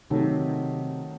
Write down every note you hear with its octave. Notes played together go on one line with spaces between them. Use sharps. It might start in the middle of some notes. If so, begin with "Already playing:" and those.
C3 D#3 F#3 A3 D#4